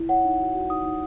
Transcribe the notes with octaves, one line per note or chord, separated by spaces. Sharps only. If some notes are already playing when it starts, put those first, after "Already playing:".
Already playing: E4
C#5 F#5
D#4
F#4
F#4
D#4 D#6
D#4